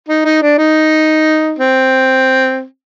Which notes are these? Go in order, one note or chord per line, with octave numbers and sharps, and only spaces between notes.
D#4
D#4
D4
D#4
C4